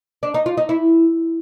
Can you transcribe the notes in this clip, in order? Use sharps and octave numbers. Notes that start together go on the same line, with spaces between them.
D4
D#4
F4
D#4
E4